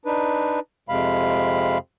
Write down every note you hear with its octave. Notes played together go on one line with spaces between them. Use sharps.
D4 D#4 B4
F2 C3 G#3 F5 B5